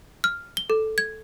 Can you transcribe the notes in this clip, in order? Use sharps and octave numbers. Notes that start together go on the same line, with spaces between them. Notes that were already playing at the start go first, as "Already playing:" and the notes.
F6
G7
A4
G#6